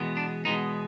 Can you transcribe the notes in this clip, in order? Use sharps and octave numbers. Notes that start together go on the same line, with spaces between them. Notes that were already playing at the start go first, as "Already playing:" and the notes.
Already playing: E2 B2 G#3 B3
D4
E2 B2 G#3 B3 D#4